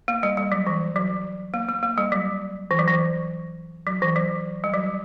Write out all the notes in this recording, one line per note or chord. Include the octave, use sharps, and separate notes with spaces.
A#3
G3
G3
F#3
E3
F#3
A#3
A#3
A#3
G3
F#3
E3
F#3
E3
F#3
E3
F#3
G3
F#3